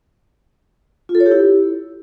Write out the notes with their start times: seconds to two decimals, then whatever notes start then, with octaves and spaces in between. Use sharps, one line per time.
1.09 F4
1.15 A4
1.20 C#5
1.26 G4
1.31 E4